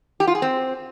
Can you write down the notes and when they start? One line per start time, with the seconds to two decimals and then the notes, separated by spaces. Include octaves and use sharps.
0.20 G4
0.27 F4
0.35 G#4
0.42 C4